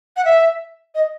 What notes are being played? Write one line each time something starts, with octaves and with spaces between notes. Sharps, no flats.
F#5
E5
D#5